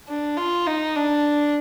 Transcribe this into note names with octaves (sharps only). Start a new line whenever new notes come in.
D4
F4
D#4
D4